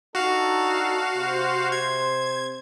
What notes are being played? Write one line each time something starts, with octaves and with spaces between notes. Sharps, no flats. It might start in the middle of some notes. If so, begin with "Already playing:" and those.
D4 D#4 F#4 A4 F5
C3 C5
G#6